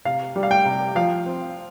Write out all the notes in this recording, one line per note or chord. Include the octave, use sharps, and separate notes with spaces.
C3 F5
G3
F5
G5
C3
F3 F5
C4